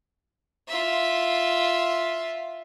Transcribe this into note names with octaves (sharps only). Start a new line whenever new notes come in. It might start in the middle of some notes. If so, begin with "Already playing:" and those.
F4 E5